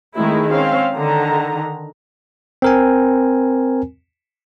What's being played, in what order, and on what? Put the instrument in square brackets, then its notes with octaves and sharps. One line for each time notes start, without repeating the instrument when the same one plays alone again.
[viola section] D#3 G#3 A3 C4 E4
C4 C#4 F5
D3 D#3 A#5
[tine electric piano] C4 A#4 G#5